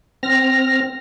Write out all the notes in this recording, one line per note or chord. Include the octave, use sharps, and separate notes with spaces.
C4 F6 A#6